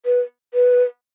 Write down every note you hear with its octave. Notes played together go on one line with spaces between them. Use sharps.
B4
B4